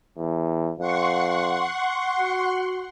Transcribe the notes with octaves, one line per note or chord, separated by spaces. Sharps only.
E2
F2 F#5 C6 C#6
F#4